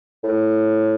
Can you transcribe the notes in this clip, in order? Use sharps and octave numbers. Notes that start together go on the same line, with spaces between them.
A2